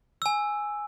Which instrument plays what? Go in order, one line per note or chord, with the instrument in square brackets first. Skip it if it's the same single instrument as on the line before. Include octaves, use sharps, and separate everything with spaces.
[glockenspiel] G#5 E6